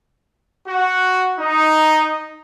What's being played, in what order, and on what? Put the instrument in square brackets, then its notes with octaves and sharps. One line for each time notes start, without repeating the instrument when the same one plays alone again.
[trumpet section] F#4
D#4